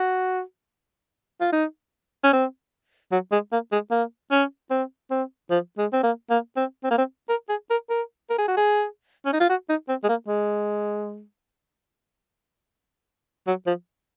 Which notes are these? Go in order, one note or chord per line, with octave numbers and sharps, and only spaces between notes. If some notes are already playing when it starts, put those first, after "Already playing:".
Already playing: F#4
F4
D#4
C#4
C4
F#3
G#3
A#3
G#3
A#3
C#4
C4
C4
F3
G#3
C4
A#3
A#3
C4
C4
A#3
C4
A#4
G#4
A#4
A#4
A#4
G#4
F#4
G#4
C#4
D#4
F4
F#4
D#4
C4
G#3
A#3
G#3
F#3
F3